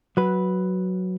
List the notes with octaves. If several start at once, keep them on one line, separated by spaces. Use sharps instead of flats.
F#3 B4